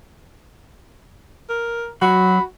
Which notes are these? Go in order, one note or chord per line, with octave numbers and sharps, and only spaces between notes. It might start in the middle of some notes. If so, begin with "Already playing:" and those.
A#4
F#3 F#4 B5